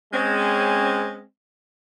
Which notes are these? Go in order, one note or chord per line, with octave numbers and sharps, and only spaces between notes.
G#3 C4 C#4